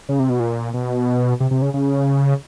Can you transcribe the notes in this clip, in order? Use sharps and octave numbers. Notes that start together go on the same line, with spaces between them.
C#3
C3
B2
A#2
B2
C3
C3
C#3
C#3